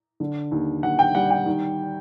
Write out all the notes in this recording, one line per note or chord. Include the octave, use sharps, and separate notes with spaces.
D3
D#2
D#2 F#5
G5
G3 F#5
G5
D#3